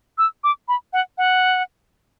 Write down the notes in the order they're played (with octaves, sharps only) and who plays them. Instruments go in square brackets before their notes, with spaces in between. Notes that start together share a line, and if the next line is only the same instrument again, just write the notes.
[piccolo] E6
D6
B5
F#5
F#5